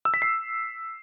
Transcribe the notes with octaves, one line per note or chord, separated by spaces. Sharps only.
E6
B6
C7